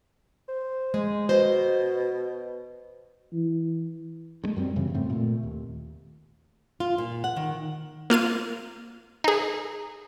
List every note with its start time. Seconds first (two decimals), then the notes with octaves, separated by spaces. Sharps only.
0.49 C5
0.94 G#3
1.29 B2 C5 D#5
3.33 E3
4.44 G2 G#3 A3
4.56 F#2 G3 C4
4.76 F#2 C#3 E3 G3
4.94 G#2 C#3 A3 C4
5.10 A#2 A3
5.43 D#2
6.80 F4
6.98 A#2
7.24 F#5
7.36 D#3
8.10 A#3 F4 F5 D#7
9.24 D#4 G#4